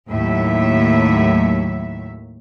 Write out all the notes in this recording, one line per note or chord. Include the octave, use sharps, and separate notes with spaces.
D#2 A2 F#3 E5